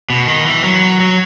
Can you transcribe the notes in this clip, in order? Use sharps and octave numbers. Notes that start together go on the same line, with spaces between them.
B2
D#3
E3
F#3
F#3